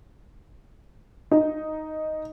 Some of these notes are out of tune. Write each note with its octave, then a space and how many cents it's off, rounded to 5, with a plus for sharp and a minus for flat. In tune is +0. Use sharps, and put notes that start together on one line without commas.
D#4 +0